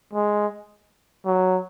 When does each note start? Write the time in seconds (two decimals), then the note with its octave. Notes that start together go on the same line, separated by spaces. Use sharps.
0.13 G#3
1.26 F#3